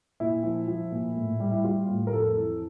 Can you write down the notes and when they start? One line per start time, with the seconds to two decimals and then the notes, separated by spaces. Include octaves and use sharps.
0.20 A#2 E4
0.43 F3
0.68 F3
0.92 A#2
1.17 A2
1.40 G3
1.51 E4
1.64 G3 F4
1.88 A2
2.07 A#4
2.13 F2 A4
2.37 E3